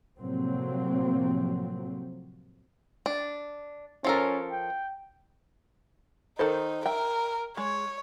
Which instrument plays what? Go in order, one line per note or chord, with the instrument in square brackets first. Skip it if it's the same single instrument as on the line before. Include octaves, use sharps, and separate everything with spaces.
[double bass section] A2 C3 F3 F#3 A#3 C4
[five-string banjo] D4
[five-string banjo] F3 A4 A#4 [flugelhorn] C#4
[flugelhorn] G5
[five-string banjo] D#3 A4 C5 [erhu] D#4
[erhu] A#4 [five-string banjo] E5 G5
[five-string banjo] G#3 [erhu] C#5